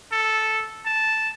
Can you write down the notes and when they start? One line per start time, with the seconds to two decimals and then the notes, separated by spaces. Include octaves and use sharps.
0.12 A4
0.86 A5